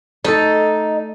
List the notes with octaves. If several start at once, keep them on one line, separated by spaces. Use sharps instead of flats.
A3 D#4 A4